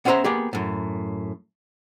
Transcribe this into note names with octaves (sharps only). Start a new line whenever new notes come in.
B3 C#4 G#4 C5 E5 A#5
A#3 B3 G4 G#4
F#2 A2